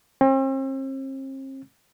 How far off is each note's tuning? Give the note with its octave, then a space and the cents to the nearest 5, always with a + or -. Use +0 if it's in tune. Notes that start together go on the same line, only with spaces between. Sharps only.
C4 +40